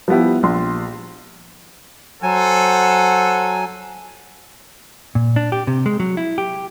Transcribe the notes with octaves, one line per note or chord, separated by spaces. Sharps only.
F3 G3 B3 E4 G4
A#1 C6
F#3 A4 C5 F#5 G#5
A#2
D4
G4
C3
G#3
F#3
E4
G4